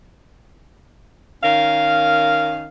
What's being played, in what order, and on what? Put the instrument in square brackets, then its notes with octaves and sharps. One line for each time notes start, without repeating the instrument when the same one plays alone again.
[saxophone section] D#3 C#4 A#4 F5